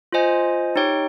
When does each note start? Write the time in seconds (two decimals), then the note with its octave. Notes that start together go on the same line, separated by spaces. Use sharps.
0.13 F4 C5 D#5 G#5
0.76 D#4 G4 C#5 G5